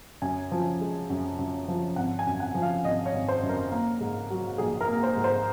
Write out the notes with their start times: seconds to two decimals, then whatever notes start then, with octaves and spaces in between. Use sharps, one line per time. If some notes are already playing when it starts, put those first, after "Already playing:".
0.22 F#2 G#5
0.52 F3
0.81 G#3
1.10 F#2
1.39 F#2
1.68 F3
1.96 G#1 F#5
2.19 G#5
2.26 F#2
2.40 F#5
2.55 F3
2.62 F5
2.85 G#1 D#5
3.06 C#5
3.13 G#1
3.28 C5
3.43 F#2
3.49 A#4
3.72 A#3
4.01 G#2
4.30 F#3
4.58 A#1 G#4
4.81 A#4
4.89 A#3
5.03 C5
5.17 G#2
5.24 C5